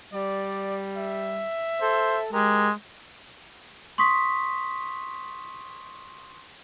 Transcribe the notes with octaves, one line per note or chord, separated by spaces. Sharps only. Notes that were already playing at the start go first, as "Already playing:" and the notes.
G3 D5
E5
A4 C5
G#3 G4 A#4
C6 C#6 D#6 B6